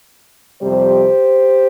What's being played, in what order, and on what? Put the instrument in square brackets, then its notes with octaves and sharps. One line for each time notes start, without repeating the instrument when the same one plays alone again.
[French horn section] F2 C3 G3 G4 C5